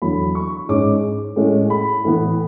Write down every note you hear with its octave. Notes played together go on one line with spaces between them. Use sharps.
E2 D3 F#3 B5
C#6
G#2 G#3 C#4 D6
A2 G#3 C#4
B5
A2 E3 B3